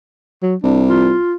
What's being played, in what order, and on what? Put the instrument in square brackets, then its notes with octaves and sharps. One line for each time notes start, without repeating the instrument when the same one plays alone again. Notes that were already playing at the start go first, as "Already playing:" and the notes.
[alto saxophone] F#3
[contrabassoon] C2 [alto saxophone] D4
[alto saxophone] F4